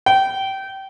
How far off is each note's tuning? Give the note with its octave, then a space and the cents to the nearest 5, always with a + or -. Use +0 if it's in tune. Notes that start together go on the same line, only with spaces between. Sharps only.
G5 -25